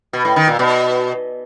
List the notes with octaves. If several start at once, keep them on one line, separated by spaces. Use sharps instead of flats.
B2
A2
D#3
A#2
B2